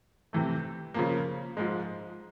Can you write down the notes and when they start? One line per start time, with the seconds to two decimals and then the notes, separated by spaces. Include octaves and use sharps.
0.33 C3 E3 A3
0.94 C#3 F3 A#3
1.57 G#2 F3 G#3